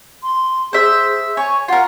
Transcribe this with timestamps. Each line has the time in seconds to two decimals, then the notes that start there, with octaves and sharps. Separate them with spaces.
0.23 C6
0.73 G#4 C5 E5
1.37 C#5 G#5
1.68 F4 A#4 F#5